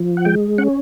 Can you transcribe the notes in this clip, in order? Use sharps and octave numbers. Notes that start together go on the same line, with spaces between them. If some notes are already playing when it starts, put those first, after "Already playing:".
Already playing: F3
F#5
G#3 G5
C#4 F#5